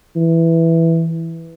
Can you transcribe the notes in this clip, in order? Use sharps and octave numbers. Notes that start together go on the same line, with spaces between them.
E3